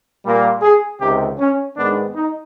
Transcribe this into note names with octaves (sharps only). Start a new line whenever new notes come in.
A#2 G3 A#3
G#4
C#2 C3 D#3 G4
C#4
G#2 D#3 G#3 B3 D4
D#4